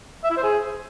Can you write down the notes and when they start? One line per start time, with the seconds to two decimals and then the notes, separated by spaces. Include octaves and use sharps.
0.24 E5
0.30 E4
0.37 C5
0.43 G#4